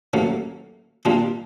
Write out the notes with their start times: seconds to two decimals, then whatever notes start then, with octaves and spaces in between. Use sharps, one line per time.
0.14 A1 A2 F#3 A#3
1.05 A#2 G3 A#3 D4 F4